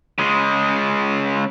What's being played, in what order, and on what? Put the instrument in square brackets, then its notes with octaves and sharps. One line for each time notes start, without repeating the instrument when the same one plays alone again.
[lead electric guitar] C#3 G#3